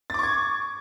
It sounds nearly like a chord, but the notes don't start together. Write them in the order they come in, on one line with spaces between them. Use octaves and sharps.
A6 D6 C#6 G#6